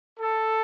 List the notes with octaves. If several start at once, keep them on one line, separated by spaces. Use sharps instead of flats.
A4